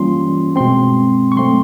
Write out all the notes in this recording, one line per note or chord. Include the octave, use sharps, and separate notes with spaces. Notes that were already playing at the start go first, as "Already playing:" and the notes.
Already playing: E3 G3 A#3 C#4 F4 C6
B2 G#3 C4 C6
C#6
F#3 A3 C4 C6